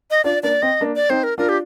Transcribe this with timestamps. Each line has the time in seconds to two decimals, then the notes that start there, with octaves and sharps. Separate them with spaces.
0.11 D#5
0.24 D4 F4 D5
0.43 A#3 D4 D5
0.62 C4 D#5
0.81 A#3 D4
0.96 D5
1.10 C4 D#4 C5
1.23 A#4
1.38 D4 F4 A#4
1.49 G4